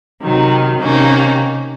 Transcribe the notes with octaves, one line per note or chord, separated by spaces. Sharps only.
C3 D#3 F#3
C3 D#3 A#3 C#4